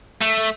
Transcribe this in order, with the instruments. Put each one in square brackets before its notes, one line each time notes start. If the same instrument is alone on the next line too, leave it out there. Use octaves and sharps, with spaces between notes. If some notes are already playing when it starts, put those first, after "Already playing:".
[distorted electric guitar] A3